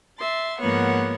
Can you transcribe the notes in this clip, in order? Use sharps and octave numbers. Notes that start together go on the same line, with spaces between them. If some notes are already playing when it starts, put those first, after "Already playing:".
E5 C6 A6
G#2 F3 A#3 B3 C#5 F#5